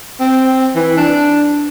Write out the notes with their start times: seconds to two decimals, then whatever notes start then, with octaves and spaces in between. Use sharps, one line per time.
0.20 C4
0.75 E3
0.97 D4